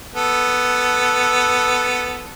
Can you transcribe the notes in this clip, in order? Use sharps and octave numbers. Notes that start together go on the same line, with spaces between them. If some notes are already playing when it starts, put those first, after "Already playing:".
B3 A4